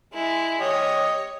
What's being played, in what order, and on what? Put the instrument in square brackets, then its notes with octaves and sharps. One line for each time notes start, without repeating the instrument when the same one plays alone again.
[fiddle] G#3 E4
[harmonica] G4 D#5 [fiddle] C#5